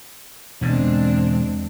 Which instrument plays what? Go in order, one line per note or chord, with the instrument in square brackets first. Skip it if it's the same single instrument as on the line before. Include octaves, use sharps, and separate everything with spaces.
[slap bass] E2 B2 D3 [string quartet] G#3 C4 D4